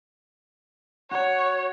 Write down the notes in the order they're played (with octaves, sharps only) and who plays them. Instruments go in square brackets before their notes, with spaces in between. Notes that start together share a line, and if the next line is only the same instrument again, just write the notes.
[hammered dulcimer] F#4 [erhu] C#5